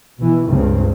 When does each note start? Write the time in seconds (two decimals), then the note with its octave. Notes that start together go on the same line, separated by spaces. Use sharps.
0.18 B2 E3
0.48 C#2 G2 A#2 C#3 C4